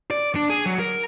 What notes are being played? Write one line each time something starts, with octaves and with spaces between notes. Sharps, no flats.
D5
D4
G#4
F#3
A#4